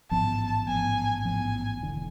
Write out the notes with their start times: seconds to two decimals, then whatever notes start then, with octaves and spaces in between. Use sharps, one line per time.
0.11 A1 G#2 F3 B3 A5
0.67 A1 G#2 F3 B3 G#5
1.25 A1 G#2 F3 B3 G#5
1.81 E1 E2 D3